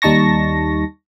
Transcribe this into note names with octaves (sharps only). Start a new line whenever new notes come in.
D#2 G3 D#4 A5 C#6 A#6